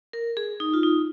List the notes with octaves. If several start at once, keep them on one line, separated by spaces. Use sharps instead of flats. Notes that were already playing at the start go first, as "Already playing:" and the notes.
A#4
G#4
D#4
F4
D#4